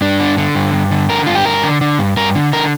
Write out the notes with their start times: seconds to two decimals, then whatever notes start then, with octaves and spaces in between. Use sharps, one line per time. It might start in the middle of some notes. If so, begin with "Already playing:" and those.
0.01 G2 D4
0.20 D3
0.38 D3
0.55 G2
0.73 G2
0.91 D3
1.09 D3 A#4
1.26 G2 F4
1.35 G4
1.45 G2 A#4
1.63 D3
1.81 D3
1.99 G2
2.17 G2 A#4
2.35 D3
2.53 D3 A#4